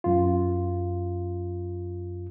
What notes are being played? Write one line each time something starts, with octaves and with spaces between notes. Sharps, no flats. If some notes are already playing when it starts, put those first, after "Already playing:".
F#2 F4